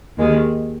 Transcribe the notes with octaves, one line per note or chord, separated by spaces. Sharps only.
D#2 D#3 G#3